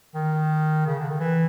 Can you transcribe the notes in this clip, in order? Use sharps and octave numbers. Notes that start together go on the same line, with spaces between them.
D#3
C#3
D3
D#3
E3